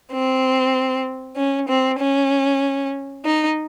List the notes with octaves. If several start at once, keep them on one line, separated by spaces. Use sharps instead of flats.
C4
C#4
C4
C#4
D#4